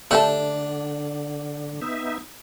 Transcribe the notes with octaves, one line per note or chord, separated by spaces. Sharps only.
D3 A3 D4 G4 A4
B3 D#4 E5